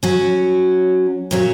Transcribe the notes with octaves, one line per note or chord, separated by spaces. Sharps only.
F#3 C#4 F#4
A#2 F#3 C#4